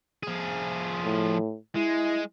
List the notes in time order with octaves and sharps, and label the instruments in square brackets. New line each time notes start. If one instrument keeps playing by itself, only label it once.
[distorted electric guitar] F3 G#4
[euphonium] A2
[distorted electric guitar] G#3 [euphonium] E4